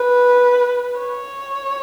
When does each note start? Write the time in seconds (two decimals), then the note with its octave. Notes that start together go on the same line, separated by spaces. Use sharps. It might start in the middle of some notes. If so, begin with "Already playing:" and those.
Already playing: B4
1.00 C#5